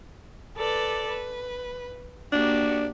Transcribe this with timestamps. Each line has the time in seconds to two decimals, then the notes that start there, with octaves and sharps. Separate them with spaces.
0.56 A4 B4 D5
1.09 B4
2.32 A#3 D4 F#4 G4